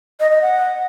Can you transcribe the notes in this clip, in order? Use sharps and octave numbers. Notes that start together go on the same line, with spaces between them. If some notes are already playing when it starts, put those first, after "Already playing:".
D#5
D#5
F#5